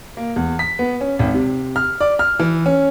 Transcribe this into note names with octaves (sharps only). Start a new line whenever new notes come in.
A#3
E2
B6
B3
C#4
G#1
C3
F6
D5
F6
E3
C#4